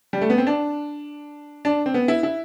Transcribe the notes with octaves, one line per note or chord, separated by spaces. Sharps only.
G3
A3
B3
C4
D4
D4
C4
B3
E4
E4